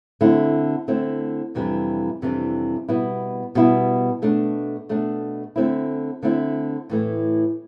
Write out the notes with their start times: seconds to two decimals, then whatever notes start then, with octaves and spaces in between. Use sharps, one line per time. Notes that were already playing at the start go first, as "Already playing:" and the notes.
0.21 D3 A3 C4 E4
0.88 D3 A3 C4 E4
1.55 F2 C3 E3 G3 D4
2.22 F2 C3 E3 G3 D4
2.89 B2 G3 B3 E4
3.55 B2 G3 B3 E4
4.22 B2 A3 D4
4.89 B2 A3 D4
5.56 D3 A3 C4 E4
6.23 D3 A3 C4 E4
6.89 A2 E3 A3